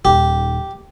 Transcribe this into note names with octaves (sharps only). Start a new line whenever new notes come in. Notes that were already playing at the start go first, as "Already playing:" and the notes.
D#1 D#3 G4